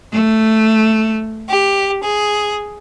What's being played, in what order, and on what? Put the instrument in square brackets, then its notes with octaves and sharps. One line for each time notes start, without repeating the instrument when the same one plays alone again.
[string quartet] A3
G4
G#4